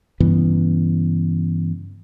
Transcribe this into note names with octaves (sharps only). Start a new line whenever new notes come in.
G2 C#3 E3 B3